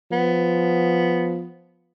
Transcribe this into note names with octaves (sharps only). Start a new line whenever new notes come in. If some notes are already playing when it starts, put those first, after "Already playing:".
F3 B3